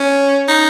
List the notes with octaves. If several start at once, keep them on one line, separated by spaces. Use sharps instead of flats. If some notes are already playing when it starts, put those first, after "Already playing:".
Already playing: C#4
D#4